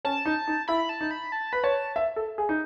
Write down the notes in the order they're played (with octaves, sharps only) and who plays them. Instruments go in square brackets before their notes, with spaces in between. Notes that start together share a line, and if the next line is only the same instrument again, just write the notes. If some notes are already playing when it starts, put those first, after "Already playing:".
[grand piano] C#4 [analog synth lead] A5
[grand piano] D#4
D#4
[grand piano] E4 [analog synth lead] B5
[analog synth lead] A5
[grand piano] D#4
[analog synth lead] B5
A5
[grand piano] B4 [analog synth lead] B5
[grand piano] C#5 [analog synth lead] A5
[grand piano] E5
A4
G#4
D#4